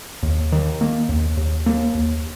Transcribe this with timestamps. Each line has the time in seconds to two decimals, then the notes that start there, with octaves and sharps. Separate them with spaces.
0.23 D#2
0.52 D#3
0.81 A#3
1.09 D#2
1.37 D#2
1.66 A#3
1.95 D#2